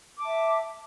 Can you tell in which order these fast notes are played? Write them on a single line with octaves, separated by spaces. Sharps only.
D6 A5 E5